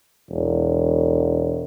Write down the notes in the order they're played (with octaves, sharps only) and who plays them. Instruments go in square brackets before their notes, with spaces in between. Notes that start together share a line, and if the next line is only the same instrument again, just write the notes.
[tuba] E1